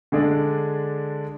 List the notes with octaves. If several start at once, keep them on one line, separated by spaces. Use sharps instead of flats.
D3 G#3 D4 G#4 D5